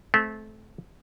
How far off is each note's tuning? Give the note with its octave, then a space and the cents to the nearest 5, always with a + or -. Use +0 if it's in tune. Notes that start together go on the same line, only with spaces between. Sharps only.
A3 -25 C4 +0